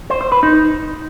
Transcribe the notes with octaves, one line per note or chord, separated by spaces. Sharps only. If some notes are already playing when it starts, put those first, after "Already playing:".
C5
C5
B4
D#4